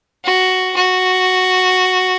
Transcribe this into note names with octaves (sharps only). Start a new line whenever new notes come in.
F#4
F#4